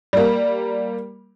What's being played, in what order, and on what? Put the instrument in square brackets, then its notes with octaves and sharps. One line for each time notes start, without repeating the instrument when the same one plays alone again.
[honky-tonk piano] G3 A#3